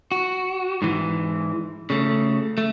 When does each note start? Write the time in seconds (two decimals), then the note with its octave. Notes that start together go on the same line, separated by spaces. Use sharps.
0.12 F#4
0.82 G#2 E3
1.90 C#3 A3
2.58 A3